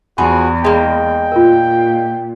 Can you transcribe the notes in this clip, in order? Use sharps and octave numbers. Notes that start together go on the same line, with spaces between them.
E2 F3 F#4 G#4 B5
G#3 A#3 G5
A#2 F4 A#4